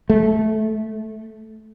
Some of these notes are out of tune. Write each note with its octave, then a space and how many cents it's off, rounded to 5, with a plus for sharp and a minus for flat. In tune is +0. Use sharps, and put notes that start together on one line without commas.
A3 -15